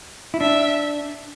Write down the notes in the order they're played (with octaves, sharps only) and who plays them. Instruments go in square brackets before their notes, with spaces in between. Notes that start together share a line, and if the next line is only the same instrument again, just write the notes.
[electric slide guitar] E4
[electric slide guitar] D4 [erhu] E5